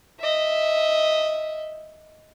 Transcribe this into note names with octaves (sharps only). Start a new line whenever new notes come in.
D#5 E5